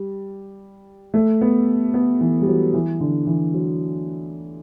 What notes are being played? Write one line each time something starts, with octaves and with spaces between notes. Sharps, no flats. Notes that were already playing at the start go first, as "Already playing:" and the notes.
Already playing: G3
A3
B3
B3
E3
G3
F#3
E3
D3
E3
F#3